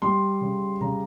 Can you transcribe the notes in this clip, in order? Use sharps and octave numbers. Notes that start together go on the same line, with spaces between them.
G3 C6
C#3
C#3 A#5